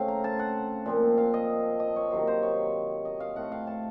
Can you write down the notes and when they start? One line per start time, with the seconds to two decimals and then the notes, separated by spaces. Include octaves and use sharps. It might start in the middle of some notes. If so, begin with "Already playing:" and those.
Already playing: C#3 A3 C4 F5
0.08 A#5
0.24 A5
0.39 F#5
0.86 A#2 F3 C4
1.18 F5
1.34 D#5
1.80 D#5
1.96 C#5
2.11 C3 D#3 F#3 A#3 C5
2.27 C5
2.43 C#5
3.05 D#5
3.20 F5
3.36 A2 A3 C4 F#5
3.52 F5
3.67 A5